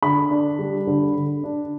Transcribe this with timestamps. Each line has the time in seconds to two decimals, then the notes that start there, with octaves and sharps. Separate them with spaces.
0.02 D3 B5
0.31 D4
0.59 G3
0.87 D3
1.16 D3
1.44 D4